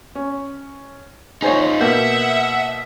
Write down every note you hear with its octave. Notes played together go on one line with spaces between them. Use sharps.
C#4
D#4 F4 G#4 C5 C#5
B2 A#3 E5 F#5 G6